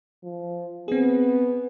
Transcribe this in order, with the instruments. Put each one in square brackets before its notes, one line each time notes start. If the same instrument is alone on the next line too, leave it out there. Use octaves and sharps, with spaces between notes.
[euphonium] F3
[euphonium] B3 [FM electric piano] C4 G#4